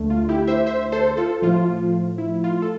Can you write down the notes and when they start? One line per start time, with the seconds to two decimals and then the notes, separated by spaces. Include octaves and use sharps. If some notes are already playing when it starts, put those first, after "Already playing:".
Already playing: D2 D3 A3
0.10 F4
0.29 E4 G4
0.47 C5 E5
0.66 C5 E5
0.92 A4 C5
1.17 F4 A4
1.42 A2 F3 A3 F4
2.18 E4
2.44 F4
2.62 A4